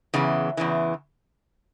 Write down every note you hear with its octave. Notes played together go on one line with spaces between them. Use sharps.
E2 C#3 E3
E2 C#3 E3